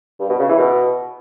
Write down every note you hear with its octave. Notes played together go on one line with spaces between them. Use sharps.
G2
B2
C#3
E3
B2